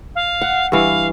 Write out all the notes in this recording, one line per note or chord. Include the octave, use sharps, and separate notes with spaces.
F5
F#5
G2 E3 F5